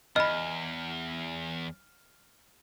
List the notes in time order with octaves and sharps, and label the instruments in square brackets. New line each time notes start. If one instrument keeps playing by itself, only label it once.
[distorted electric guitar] E2 [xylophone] D#5 B5 [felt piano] F6